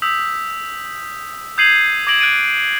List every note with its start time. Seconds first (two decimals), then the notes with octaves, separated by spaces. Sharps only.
0.02 D#6 E6 G6 B6
1.58 D#6 G6 G#6 C7 D#7 F#7
2.07 D6 G#6 A#6 D7 F#7
2.20 F#6 A6 D7 D#7